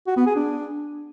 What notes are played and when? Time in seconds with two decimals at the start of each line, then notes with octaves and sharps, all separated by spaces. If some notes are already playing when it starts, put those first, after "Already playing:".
0.07 F#4
0.17 B3
0.26 G#4
0.36 D4